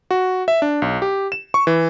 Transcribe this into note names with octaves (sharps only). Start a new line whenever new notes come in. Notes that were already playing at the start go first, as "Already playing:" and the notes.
F#4
E5
D4
B1
G4
E7
C#6
E3